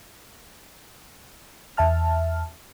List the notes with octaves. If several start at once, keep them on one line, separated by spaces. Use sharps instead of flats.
E2 E5 A5 F6